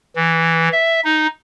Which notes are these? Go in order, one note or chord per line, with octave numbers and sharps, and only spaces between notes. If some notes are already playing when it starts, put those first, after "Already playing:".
E3
E5
D#4